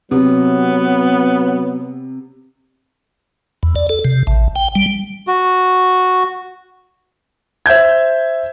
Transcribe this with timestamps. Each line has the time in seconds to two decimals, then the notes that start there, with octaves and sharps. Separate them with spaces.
0.11 C3 F#3 B3
3.63 E2
3.76 D5
3.89 A4
4.05 C3
4.27 A1
4.56 G5
4.75 G3
5.27 F#4
7.66 C5 E5 G6 G#6